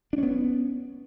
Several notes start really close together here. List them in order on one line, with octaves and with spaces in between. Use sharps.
D4 C#4 B3